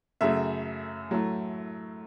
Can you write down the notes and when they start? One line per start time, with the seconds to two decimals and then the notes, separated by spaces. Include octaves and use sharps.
0.21 F#2 C#3 F#3 A3 E5
1.11 A2 F#3 A3